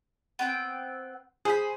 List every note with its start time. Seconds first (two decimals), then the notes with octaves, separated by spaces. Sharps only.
0.39 B3 C4 G5
1.45 G#4 C5 B5